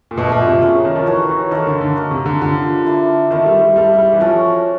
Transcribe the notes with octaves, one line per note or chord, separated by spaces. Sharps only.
A#2
B2 F3 A3 D4 F4
B2
C3
C#3 C#4 F#4 A#4 C#5
D#3
F3
E3 D#4 F#4 A4 C#5
E3
D#3 A#3 D#4 F#4 A4
D3
D3
D#4 F#4 A#4
C3
D3
D3 G3 C4 F4
E4 A4 D5
D#3 A3 C4 E4
G3
G3
G3 E4 A4 D5 F5
G3
E3
F3 C#4 F#4 A4